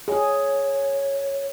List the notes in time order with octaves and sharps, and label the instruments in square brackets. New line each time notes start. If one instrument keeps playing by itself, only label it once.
[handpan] G#4 [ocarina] C#5